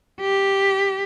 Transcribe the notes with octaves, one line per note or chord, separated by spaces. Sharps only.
G4